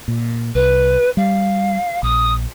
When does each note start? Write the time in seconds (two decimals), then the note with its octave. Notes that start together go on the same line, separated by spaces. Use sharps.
0.08 A#2
0.55 C2 B4
1.17 G3 F5
2.03 A#1 D#6